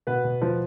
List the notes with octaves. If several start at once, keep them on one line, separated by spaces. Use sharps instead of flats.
B2 B3 B4
B2
F3